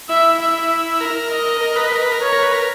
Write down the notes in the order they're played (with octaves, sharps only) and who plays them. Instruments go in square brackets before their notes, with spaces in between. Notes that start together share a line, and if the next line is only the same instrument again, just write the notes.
[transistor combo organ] E4 [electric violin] E5
[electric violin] E5
[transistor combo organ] A#4
[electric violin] D#5
[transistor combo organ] A#4
B4
A#4
B4
A#4
[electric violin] C#5
[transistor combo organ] A#4
B4
A#4